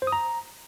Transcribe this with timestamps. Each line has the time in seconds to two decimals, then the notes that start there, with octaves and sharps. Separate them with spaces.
0.02 C5
0.07 D#6
0.12 A#5